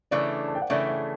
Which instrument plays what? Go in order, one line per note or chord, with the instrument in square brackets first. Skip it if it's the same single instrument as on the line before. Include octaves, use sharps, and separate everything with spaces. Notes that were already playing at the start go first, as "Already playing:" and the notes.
[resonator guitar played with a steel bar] C#3 E3 A3 D4 [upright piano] D5
[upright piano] A5
G5
F#5
[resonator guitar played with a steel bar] C#3 E3 A3 D4 [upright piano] E5
[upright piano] E5